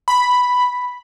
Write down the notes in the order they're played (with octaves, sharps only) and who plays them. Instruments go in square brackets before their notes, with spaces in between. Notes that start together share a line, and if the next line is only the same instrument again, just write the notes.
[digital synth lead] B5